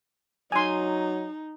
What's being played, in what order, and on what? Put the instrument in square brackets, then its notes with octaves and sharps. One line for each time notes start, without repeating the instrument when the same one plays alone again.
[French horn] F#3 [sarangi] D#4 [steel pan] G#5 C6